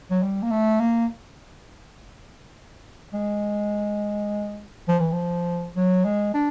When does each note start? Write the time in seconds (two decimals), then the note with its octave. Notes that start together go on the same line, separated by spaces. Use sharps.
0.11 F#3
0.23 G3
0.42 A#3
0.51 A3
0.80 A#3
3.14 G#3
4.88 F3
5.00 E3
5.12 F3
5.76 F#3
6.05 G#3
6.34 D4